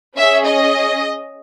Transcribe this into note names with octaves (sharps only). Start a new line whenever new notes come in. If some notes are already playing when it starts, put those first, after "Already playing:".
C#4 G#4 E5
D#5